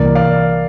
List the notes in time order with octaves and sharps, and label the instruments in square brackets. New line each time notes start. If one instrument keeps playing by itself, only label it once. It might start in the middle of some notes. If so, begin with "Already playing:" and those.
Already playing: [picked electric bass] C2 C3 E3 A#3 [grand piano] A#4 D5
[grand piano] D5 F5